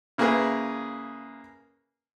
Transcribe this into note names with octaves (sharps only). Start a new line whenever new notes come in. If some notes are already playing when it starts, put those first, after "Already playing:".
C#3 A#3 E4 G#4 B4